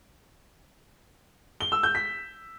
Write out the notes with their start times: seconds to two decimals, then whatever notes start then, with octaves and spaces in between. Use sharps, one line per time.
1.61 G7
1.72 E6
1.83 G6
1.95 B6